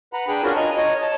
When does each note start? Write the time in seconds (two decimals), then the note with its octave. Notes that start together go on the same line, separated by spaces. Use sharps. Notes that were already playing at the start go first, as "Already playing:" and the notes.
0.13 B4 F#5 A#5 B5
0.28 D4 G#4 B4 G5 B5
0.43 C#4 D4 F4 F#4 G#4 A#4
0.56 D#5 G#5 A#5
0.76 C#5 D#5
1.02 C#5 A5